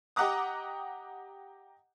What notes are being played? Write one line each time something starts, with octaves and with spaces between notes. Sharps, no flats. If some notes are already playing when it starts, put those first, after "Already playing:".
G4 D#5 F#5 A#5 D6 D#6